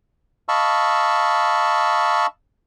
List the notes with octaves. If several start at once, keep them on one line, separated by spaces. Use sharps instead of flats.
D#5 F5 A5 B5 C#6 E6